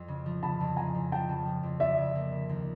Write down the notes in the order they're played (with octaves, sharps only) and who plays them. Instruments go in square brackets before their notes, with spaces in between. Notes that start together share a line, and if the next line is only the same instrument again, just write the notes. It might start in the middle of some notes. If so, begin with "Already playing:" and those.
Already playing: [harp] F2
C#3
F3
[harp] C#3 [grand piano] A5 B5
[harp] F2
[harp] F2 [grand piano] G#5 A#5
[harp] F2
[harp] F3 [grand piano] G5 A5
[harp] C#3
F3
F2
[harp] F3 [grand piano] D5 E5
[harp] C#3
A#3
C#3
D#2